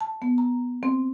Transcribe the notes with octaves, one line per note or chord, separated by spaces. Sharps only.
A5
B3
A#5
C4